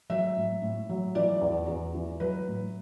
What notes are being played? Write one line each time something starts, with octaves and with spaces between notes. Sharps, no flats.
F#3 E5
A2
A2
F#3
E3 D5
E2
E2
E3
F#3 B4
A2